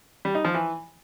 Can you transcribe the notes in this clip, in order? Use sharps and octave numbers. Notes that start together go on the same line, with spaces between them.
G3
D#4
F3
E3